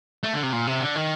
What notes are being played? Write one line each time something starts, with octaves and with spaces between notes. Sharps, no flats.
A3
D3
C3
A#2
C3
D3
D#3